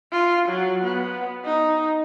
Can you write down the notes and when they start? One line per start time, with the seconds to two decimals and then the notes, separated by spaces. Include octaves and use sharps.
0.12 F4
0.49 F#3
0.84 B3
1.45 D#4